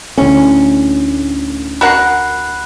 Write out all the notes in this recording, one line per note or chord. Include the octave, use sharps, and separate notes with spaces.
D2 A2 C#4
F#4 A#4 F#5 B5 F#6 C7